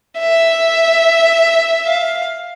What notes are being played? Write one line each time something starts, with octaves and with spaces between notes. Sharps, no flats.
E5
F5